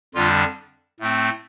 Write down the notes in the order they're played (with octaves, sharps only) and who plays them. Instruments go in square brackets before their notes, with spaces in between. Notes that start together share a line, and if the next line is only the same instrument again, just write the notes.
[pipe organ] F2 D3 G3 D4 F4
A2 A3 C4